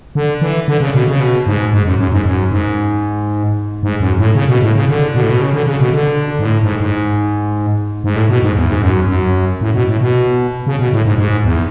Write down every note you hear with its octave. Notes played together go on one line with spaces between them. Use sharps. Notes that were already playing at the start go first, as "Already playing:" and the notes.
D3
E3
D3
C#3
B2
C#3
B2
G#2
G#2
F#2
F#2
G#2
F#2
G#2
G#2
F#2
A2
C#3
B2
A2
C#3
D3
B2
A2
B2
C#3
D3
C#3
B2
D3
G#2
A2
G#2
G#2
G#2
A2
B2
G#2
E2
G#2
F#2
F#2
A2
B2
A2
B2
C#3
B2
A2
G#2
G#2
E2